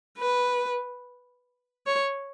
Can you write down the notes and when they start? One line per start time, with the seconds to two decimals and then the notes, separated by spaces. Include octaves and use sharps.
0.18 B4
1.87 C#5